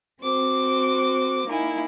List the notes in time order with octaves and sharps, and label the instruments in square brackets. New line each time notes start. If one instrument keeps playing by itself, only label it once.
[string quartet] C4 F#4 C5 D6
A#3 D#4 E4 G#5